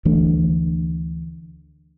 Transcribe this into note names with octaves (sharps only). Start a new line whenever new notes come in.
D2 E3 A3 D4